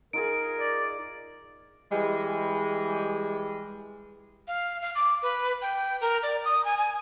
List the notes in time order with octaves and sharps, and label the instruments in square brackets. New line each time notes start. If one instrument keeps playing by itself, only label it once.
[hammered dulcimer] D#4 F4 G#4 [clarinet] A#4 [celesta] D7
[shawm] D5
[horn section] E3 G3 G#3
[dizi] F5
F5
D6
B4
G5
A#4
D5
D#6
G#5
G#5